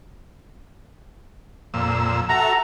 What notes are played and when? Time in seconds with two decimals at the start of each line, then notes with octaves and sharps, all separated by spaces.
1.74 F2 A#2 E6
2.29 F#4 A4 E5 A#5